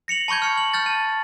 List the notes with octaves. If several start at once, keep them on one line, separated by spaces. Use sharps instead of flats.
A#6 C#7 F7 F#7
A5 B5 C#6 G6 G#6
F6 C#7
F#7
F6 G6 A6
A5